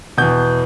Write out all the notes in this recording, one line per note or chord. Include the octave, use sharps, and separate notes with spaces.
E2 B2 G6